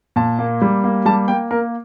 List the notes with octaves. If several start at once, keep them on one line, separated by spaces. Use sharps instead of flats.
A#2 A5
A#3
G3
A#3
G3 A5
A#3 G5
A#3 A#4